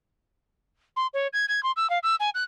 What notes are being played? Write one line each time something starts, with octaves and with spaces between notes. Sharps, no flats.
C6
C#5
G#6
G#6
C6
E6
F5
E6
G#5
F#6